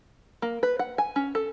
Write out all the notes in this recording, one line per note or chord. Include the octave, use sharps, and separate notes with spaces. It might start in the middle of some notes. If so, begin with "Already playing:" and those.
A#3
B4
F#5
G#5
C#4
A4